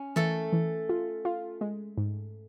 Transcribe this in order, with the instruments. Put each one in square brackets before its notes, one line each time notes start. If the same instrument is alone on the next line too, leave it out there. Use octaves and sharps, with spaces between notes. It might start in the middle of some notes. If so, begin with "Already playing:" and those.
Already playing: [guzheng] C#4
[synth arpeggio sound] E3 [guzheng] A3 A4
[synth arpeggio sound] E3
F4
F4
G#3
G#2